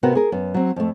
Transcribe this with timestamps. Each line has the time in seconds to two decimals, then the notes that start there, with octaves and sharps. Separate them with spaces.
0.03 C3 B3 F#4 A#4
0.15 G#4 A#4
0.32 F#2 B3
0.54 F#3 C4
0.76 F2 A3